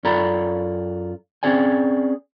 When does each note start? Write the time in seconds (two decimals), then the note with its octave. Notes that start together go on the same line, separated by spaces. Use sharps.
0.04 F#2 F4 A4 D5 A#5 B5
1.43 C4 C#4 G#4 D5 G#5